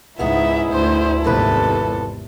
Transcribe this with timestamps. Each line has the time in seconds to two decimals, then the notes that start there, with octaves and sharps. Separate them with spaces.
0.19 C#2 G#2 B3 D#4 E4 G#4 E5
0.73 D2 C5
1.24 G#1 E2 C3 E3 F3 A4 B4